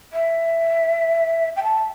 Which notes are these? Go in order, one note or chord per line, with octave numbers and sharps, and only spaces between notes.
E5
G5
A5